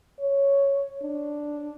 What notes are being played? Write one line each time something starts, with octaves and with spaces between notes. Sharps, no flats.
C#5
D4